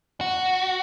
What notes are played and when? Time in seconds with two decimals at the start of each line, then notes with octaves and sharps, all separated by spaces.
0.21 F#4